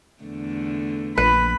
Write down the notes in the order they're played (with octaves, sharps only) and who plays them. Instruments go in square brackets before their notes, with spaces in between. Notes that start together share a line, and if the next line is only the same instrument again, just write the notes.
[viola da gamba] E2 D3 A3
[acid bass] A#1 [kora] B4 [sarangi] B5